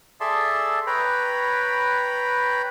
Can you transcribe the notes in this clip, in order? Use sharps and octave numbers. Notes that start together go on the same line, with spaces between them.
G#4 A4 D5 E5 A5 C6
B4 C#5 G5 A#5 B5